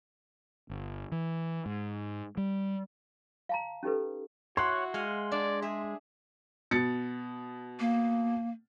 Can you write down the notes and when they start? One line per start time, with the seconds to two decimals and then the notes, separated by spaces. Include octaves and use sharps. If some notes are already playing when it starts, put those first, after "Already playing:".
0.70 G1
1.12 E3
1.66 G#2
2.37 G3
3.49 F5 A5 A#5
3.83 C#4 D#4 G4 A4 B4
4.57 E4 F#4 C#5 F#5 C6
4.94 G#3 F5 F#5 G#5
5.32 D4 D5
5.62 G#4 E5
6.71 B2 A6 C#7
7.80 A#3